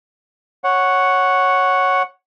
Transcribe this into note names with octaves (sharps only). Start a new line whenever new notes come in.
C#5 F#5